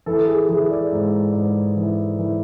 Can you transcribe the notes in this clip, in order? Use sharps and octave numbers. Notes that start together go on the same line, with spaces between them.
E3 A4
G#4
E3 G#4
D5
G#2
G#2
E3
E3